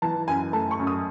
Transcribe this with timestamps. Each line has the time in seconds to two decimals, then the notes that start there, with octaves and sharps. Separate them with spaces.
0.02 E3 A5
0.28 F#2 G#5
0.53 A3 A5
0.71 C#6
0.79 F#2
0.87 D#6